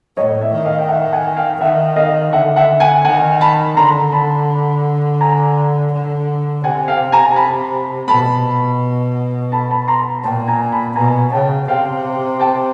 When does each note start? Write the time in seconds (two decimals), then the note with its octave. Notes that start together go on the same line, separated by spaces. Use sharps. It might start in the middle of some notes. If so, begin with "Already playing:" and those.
0.17 A2 C#5 D#5
0.41 D5 E5
0.53 D#3
0.64 D#5 F5
0.79 G5
0.88 E5 F#5
1.12 F#5 G#5
1.37 F5 G5
1.61 D#3 E5 F#5
1.96 D#5 F5
2.32 D3 E5 F#5
2.56 E5 F#5
2.80 F#5 G#5
3.05 D#3 F#5 G#5
3.41 A5 B5
3.76 D3 A#5 C6
4.12 A5 B5
5.21 G#5 A#5
5.92 D3
6.64 C3 F#5 G#5
6.88 F5 G5
7.12 G#5 A#5
7.32 A#5
7.36 A5 B5
8.08 B2 A5 B5
9.52 A5 B5
9.71 A5 B5
9.88 A#5 C6
10.24 A#2 G5 A5
10.48 G#5 A#5
10.72 A5 B5
10.96 B2 G#5 A#5
11.32 C#3 G5 A5
11.68 C3 F5 G5
12.39 G5 A5